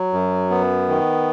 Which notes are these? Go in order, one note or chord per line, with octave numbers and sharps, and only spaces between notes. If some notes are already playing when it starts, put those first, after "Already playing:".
Already playing: F#3
F#2
B3
D#3